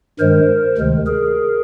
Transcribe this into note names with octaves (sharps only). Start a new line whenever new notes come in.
G2 D#3 G#3 A#4 C5
D2 C3 D#3 G#3
G#4 A#4